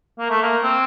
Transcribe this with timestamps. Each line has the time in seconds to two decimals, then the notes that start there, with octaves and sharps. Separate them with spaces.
0.19 A#3
0.30 A3
0.42 A#3
0.63 C4